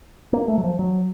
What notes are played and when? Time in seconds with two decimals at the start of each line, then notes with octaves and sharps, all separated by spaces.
0.33 A#3
0.48 A3
0.58 F#3
0.64 F3
0.79 F#3